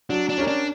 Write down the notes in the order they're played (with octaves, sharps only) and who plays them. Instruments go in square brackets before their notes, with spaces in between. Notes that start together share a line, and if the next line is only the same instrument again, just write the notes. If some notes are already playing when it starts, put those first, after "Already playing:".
[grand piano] F#3 [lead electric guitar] D4
[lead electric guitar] D4
[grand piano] C#4 G4 A#4 D5
[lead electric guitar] D4